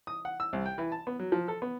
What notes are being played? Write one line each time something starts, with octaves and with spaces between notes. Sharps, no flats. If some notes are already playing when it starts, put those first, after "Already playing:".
D#6
F#5
E6
C2
G5
E3
A5
B3
F#3
F3
A4
B3